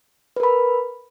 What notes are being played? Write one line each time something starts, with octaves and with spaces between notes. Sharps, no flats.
A#4 B4 B5